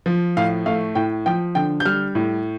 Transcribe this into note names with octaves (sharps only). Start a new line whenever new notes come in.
F3
A2 F5
A3 F5
A2 G5
F3 G5
D3 G5
G6
G3 F6
A2